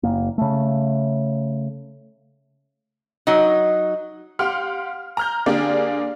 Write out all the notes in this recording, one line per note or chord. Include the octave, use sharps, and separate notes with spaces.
F#1 A#3
C#3 A3
F#3 D#4
G4 F5 F#5 C6 F6
A#5 F6 G6
D3 A#3 D4 G4 G#4 D5